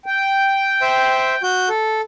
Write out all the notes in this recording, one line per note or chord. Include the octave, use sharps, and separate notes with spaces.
G5
C5 E5
F#4 G6
A4